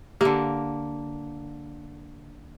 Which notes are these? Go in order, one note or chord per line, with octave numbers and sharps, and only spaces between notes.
D3 A#3 G4